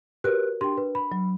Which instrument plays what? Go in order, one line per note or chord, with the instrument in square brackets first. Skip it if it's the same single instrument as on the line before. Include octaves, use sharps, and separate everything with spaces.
[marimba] F#4 A#4 C#5 [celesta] G4 B4 F#6
[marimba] D4 G5 [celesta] G4 C6
[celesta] B4
B5
[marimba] F#3